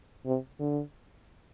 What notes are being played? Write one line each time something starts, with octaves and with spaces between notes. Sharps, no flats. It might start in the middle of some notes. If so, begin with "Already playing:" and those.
C3
D3